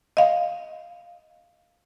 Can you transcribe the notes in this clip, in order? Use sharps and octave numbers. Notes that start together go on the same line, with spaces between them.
D#5 F5